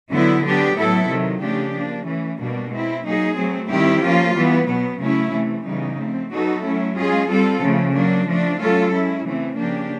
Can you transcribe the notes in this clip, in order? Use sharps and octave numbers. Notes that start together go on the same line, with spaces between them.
D3 F#3 B3 E4
D3 F#3 B3 D4 G4
A2 F#3 B3 E4 A4
C3 D#3 F#3
C#3 F3 A3 D4 G4
F3 A#3 D4
E3 A3 C#4
B2 G3 A#3 D4
G#3 C4 E4
F#3 A#3 D#4 G#4
F#3 A3 C4
D#3 G3 C4 E4 G4
F3 A#3 C#4 F4
E3 G3 B3
B2 F#3 B3
C#3 F#3 A3 C#4 E4
C3 E3 A3
C#3 E3 G3 B3 D#4
F3 A3 C4
F#3 B3 D#4 F#4 A4
F#3 A3 C#4 E4
G#3 C#4 F4 G#4
G3 C4 F4 A4
C#3 F3 A3
F#3 A#3 D4
F3 A3 D4
F#3 A3 C#4 F4 A4
G#3 C#4 E4
C#3 E3 A3 C4
C#3 F3 A#3 D4 G4